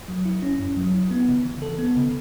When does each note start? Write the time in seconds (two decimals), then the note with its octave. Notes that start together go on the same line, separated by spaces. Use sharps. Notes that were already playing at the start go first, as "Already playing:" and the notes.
0.08 F#3
0.25 E4
0.42 C#4
0.59 F#2
0.77 F#3
0.94 E4
1.11 B3
1.28 C#3
1.45 E3
1.62 A4
1.79 B3
1.96 C#3